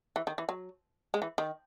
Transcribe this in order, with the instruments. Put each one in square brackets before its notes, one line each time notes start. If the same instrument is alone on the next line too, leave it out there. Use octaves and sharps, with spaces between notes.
[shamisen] E3
D#3
E3
F#3
G#3
E3
D#3